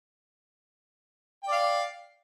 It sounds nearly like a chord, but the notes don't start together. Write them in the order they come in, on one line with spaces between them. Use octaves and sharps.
G5 D5 F5